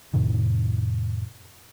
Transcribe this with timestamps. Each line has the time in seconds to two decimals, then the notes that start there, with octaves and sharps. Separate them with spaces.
0.14 F2 A2 C3 D#3